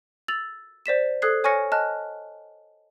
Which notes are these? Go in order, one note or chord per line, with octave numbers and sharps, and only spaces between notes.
E6 A6 F7 F#7
C5 D5 B6 E7
A4 C5 D#6 F#6 G#6 C7
C#5 G#5 C#6 F6 A#6 C#7
D#5 G#5 A5 F6 F#6